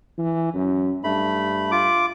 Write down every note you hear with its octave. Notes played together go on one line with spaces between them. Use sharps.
E3
F#2
G2 A3 B5
F4 D6